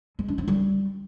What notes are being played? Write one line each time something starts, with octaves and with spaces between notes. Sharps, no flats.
G#3
D4
C4
G3